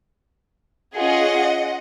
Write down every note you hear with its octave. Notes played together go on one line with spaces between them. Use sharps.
C#4 F4 G#4 D#5 F#5